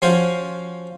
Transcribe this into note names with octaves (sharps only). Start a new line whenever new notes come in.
F3 C#4 F4 F#4 C5 C#5